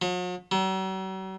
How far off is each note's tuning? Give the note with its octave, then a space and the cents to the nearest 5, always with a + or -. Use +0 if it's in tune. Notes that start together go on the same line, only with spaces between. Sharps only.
F#3 -45
F#3 +45